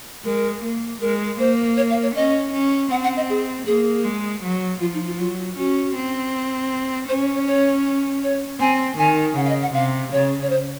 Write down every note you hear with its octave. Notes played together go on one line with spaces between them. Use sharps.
G#3 A#4
A#3
G#3 A#4
A#3 C5
C#5
F5
C#5
C#4 D#5
C#4
C4 F#5
F#5
D#5
G#4
A#3 G#4
G#3
F#3
F3 F4
D#4
F4
F#3 F4
C#4 F#4
C4
C#4 C5
C#5
C#5
C#5
C#5
C4 G#5
D#3 G#5
C#3 F#5
F5
D#5
F#5
C3 F5
C#3 C#5
C#5
C5